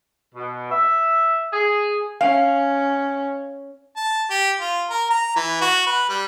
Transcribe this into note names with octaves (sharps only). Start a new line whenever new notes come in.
B2
E5
G#4
C#4 F5
A5
G4
F4
A#4
A#5
E3
F#4
B4
G3